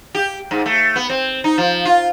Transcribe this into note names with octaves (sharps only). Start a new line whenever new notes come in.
G4
G#2
A3
B3
C4
D#4
F3
F4